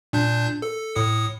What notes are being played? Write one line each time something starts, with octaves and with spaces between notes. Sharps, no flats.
A#2 D4 G6
A4
A2 D#6 C#7